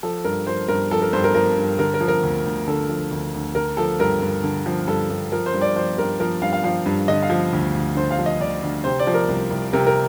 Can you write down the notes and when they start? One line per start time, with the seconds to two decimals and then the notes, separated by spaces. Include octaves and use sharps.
0.03 F3 A4
0.24 G2 A#4
0.47 F3 C5
0.68 G2 A#4
0.91 F3 A4
1.02 A#4
1.13 G2 C5
1.24 A#4
1.34 F3 A#4
1.58 G2
1.79 D3 A#4
1.94 A#4
2.01 F3
2.08 A#4
2.23 D2
2.45 D2
2.67 D3 A4
2.89 F3
3.11 D2
3.34 D2
3.55 D3 A#4
3.77 F3 A4
3.99 G2 A#4
4.22 G2
4.44 D3
4.66 F3
4.87 G2 A4
5.10 G2
5.32 F3 A#4
5.46 C5
5.54 G2
5.61 D5
5.76 F3 C5
5.98 G2 A#4
6.20 F3 A#4
6.42 G2 F5
6.53 F5
6.64 F3 F5
6.86 G2
7.08 D3 D#5
7.23 F5
7.30 F3
7.53 D2
7.75 D2
7.96 D3 C5
8.11 F5
8.19 F3
8.26 D#5
8.40 D2 D5
8.63 D2
8.84 C3 C5
9.00 D5
9.07 F3
9.14 A#4
9.28 C2
9.50 C2
9.73 C3 A#4
9.87 A#4